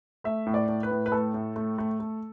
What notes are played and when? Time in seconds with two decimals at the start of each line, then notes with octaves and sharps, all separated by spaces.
0.24 A3 E5
0.46 A2
0.54 D5
0.68 A2
0.83 B4
0.91 A2
1.06 B4
1.12 A3 A4
1.34 A2
1.56 A3
1.78 A3
2.00 A3